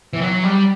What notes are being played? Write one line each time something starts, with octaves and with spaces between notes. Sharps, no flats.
E3
F#3
G3